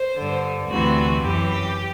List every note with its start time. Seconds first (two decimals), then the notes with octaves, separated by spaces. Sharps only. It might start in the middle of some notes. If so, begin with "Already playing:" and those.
Already playing: C5
0.16 G2 D3
0.68 D2 C3 E3 F#4
1.21 F#2 E3 G4